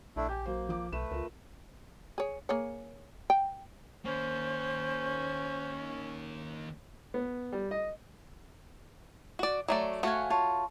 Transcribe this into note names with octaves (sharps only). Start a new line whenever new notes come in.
A#1 A3 D4 E4
G4 G#5 G6
F#3 A#3 F#4 C5
F3 F4 D6
B1 A3 B4 E7
C#2 F4 A#4
G#4 C#5
A#3 G#4 C#5
G5
D#3 A#3 C#4 C5
B3
G3
D#5
F#4 D5
F#3 A3 D5
A3 F#4 C#5 F5 G#5
F4 C#5 A5